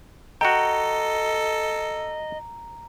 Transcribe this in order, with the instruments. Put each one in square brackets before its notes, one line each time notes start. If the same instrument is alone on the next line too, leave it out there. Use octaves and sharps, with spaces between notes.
[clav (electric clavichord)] F#4 G5 [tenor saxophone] A4 [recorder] D#5 [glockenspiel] A#5